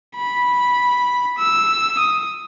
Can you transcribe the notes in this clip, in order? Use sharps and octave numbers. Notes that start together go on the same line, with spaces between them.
B5
E6
D#6